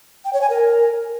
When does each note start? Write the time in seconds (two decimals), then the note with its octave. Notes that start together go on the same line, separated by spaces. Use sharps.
0.25 G5
0.33 C#5
0.41 G#5
0.50 A#4